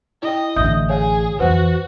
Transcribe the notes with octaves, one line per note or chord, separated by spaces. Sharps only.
E4 D#5 G5
A1 D3 E5 D#6 G6
G#4 C#5 F5 G#5
F2 E3 F#4 B4 C5 F#5